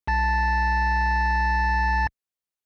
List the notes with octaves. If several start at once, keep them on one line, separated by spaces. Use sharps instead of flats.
B1 A5 A6